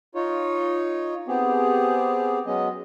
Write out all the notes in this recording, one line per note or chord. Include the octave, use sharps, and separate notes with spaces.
D#4 F4 C#5
B3 C4 G4 G#4
F#3 G#3 B3 C#4 D#5